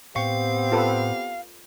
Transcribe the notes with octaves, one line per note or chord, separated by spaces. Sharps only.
A2 B3 C4 G4 F5 G5 C#6
F4 A4 B4